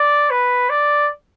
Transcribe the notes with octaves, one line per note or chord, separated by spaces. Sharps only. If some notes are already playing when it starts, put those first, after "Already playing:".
Already playing: D5
B4
D5